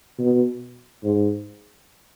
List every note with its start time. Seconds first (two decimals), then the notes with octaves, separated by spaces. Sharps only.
0.18 B2
1.04 G#2